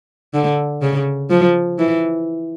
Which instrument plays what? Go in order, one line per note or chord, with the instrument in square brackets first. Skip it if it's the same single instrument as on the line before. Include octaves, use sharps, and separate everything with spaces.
[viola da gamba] D3
C#3
F3
E3